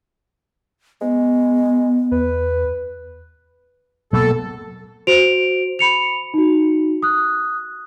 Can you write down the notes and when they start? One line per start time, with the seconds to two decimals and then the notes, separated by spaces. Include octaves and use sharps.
1.01 G#3 B3
2.12 E2 B4
4.13 B2 F#3 A#3 A4
5.07 F#4 C5 D7 F7
5.79 B5 C#7 F7
6.34 D#4 F#4
7.03 D#6 F#6